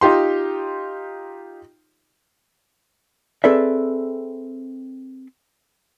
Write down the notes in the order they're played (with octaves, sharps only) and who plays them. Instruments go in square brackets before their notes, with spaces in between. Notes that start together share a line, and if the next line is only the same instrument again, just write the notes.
[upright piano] D#4 F4 G4 C6
[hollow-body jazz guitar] C4 G#4 A4 B4 D5 E5